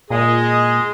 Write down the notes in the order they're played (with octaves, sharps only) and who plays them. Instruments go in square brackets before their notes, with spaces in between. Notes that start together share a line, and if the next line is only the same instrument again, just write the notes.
[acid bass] A#2 [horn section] G#3 D#5 [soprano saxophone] G#4